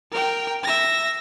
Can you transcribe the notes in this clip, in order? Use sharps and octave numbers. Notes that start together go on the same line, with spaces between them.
A#4 G5
E5 A#6